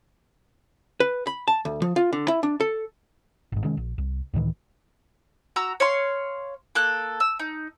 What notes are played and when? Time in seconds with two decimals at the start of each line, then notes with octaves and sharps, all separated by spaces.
1.00 B4
1.27 B5
1.48 A5
1.65 D2
1.82 F3
1.96 F4
2.13 D3
2.28 E4
2.43 D4
2.60 A4
3.52 G1 G#2
3.64 C3 D#3 G#3 C#4
3.77 A#1
3.98 C2
4.34 C#2 A2 D#3 E3
5.56 F#4 A#5 E6
5.80 C#5 F5 C6
6.75 A#3 A4 F#6
7.20 E6
7.39 D#4